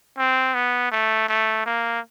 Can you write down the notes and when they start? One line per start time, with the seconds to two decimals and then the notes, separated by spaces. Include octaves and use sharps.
0.18 C4
0.55 B3
0.92 A3
1.29 A3
1.66 A#3